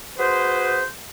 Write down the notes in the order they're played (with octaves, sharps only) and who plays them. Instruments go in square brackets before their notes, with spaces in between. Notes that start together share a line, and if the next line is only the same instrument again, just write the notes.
[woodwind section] F#4 G#4 B4 C5